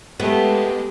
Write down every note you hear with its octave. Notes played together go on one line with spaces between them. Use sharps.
G#3 A3 B3 G4